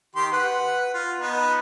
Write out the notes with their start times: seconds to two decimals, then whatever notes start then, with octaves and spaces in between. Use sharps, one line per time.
0.16 D#3 G4 C6
0.32 B4 F#5
0.94 F4
1.20 B3 D#4